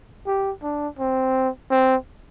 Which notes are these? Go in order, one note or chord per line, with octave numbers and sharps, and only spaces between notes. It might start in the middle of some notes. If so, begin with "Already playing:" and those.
G4
D4
C4
C4